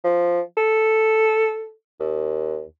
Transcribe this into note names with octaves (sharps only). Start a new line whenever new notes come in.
F3
A4
D#2